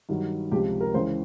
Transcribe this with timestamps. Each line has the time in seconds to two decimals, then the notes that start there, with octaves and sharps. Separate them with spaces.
0.09 G2 D#3 F#3
0.51 C#2 C3 F3 G4
0.81 A#4
0.94 C#2 C#3 E3 C5